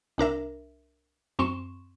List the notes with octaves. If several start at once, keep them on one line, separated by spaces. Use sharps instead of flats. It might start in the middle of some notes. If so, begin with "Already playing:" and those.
C2 D4 A#4 E5
F#2 C4 C6 C#6 E7